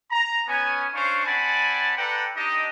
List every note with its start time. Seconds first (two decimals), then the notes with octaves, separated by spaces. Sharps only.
0.11 A#5
0.48 B3 C#4 G#5
0.95 C#4 D4 C5 C#5 F5 C#6
1.25 C4 D5 F#5 G#5 A5 B5
1.98 A4 B4 D5 F#5 G5 A#5
2.36 D4 D#4 G4 D#5